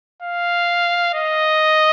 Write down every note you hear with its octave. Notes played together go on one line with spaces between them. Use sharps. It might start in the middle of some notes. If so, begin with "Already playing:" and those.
F5
D#5